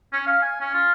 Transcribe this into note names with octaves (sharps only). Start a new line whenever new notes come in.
C#4
F5
G#5
C#4
F4